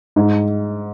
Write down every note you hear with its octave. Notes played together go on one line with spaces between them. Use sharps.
G#2